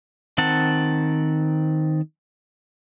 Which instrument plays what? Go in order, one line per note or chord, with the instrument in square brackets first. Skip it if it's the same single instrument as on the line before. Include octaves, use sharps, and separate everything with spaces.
[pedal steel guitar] D#3 C4 F#5 A5